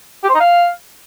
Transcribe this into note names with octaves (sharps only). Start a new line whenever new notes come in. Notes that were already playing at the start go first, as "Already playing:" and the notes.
G4
C5
D#4
F5